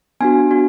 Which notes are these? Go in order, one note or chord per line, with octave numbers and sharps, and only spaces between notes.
B3 D4 F#4 G#5
B3 D4 F#4